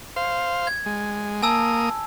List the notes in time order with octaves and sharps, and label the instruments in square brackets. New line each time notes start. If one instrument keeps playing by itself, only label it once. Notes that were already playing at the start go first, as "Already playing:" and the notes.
[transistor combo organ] C5 F5
[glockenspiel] G#6
[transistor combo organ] G#3
[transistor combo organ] A#3 D#6 [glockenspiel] G#5 A5 E6